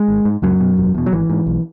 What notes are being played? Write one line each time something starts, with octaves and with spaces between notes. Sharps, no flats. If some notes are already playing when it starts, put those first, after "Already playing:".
Already playing: G#3
G#1
G#2
C#2 F#2 F#3
B2
E1
E2 B2
F#3
G#1 E3
G#2
B1